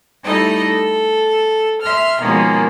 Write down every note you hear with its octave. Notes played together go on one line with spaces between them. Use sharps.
G3 A3 D#4 E4 A4 D#5
A4
E5 C6 F6
B2 D#3 F3 G#3 A#3 C#4